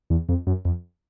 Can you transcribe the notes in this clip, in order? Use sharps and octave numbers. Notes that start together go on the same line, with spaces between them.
E2
F2
F#2
F2